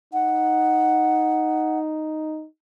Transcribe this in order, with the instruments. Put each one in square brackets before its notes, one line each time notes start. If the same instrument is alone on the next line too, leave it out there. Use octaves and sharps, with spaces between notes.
[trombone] D#4 [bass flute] F#5